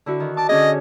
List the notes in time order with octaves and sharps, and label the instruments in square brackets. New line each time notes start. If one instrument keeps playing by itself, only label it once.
[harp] D3 E4 F#4
D#3
[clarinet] A5 [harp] D6
[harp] D3 C#4 G#4 [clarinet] D#5